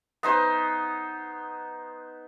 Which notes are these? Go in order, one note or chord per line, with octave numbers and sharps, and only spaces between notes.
B3 D#4 C5